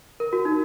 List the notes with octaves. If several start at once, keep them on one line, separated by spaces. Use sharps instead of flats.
A#4
F#4
D#4